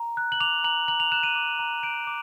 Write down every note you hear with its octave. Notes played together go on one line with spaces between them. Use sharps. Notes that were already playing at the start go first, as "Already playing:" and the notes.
Already playing: A#5
F#6
F#7
D6 F7
A#5 F#7
A#5 F#7
F7
F#6 E7
D#7
D6
A#5
G6 D7
D6